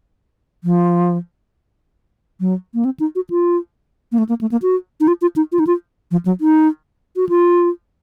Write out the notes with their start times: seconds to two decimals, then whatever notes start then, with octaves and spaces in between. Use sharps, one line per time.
0.64 F3
2.40 F#3
2.74 A#3
2.85 C4
3.00 D#4
3.15 F#4
3.30 F4
4.12 A#3
4.18 A3
4.29 A#3
4.41 A3
4.52 A#3
4.62 F#4
5.00 D#4
5.08 F4
5.21 F4
5.36 D#4
5.52 F4
5.59 D#4
5.67 F4
6.11 F3
6.26 F#3
6.41 D#4
7.16 F#4
7.29 F4